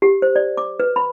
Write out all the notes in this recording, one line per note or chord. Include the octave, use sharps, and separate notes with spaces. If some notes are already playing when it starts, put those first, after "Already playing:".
G4
C5
D5
D6
B4
B5